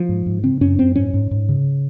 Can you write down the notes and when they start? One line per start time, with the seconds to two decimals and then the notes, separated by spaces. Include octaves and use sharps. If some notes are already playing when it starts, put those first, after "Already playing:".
Already playing: F3
0.09 G#2
0.26 G#2
0.43 C#3 C4
0.61 F#2 C#4
0.78 F#2 C4
0.96 G#2 C#4
1.14 G#2
1.31 G#2
1.49 C#3